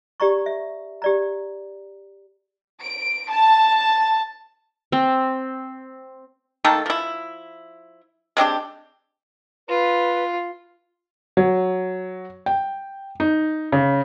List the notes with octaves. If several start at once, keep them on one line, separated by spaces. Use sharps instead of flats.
G4 D5 A#5 C#6
E5
G4 D5 A#5
D7
A5
C4
D#3 A3 A#3 A4
F3 E4
G#3 C4 D4 G4
F4 B4
F#3
G5
D#4
C#3